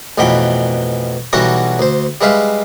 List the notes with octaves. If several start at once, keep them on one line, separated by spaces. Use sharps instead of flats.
A1 F2 B2 E3 G5 B5
B1 E3 G3 F#4 F#5 A#5
D2 C5
G3 G#3 B4 E5 F5